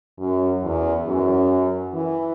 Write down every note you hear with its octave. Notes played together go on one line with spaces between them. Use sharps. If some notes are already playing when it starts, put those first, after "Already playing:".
F#2
E2
F#2
E3